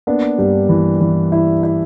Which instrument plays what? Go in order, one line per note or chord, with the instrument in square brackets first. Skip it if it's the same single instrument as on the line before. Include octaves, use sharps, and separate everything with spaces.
[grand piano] A#3 [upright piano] B3 D4
[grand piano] G2 [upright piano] G3
[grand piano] E3
E3
E4
E4